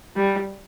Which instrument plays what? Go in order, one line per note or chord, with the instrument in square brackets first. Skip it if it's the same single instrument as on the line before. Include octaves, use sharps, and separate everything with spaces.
[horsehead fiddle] G3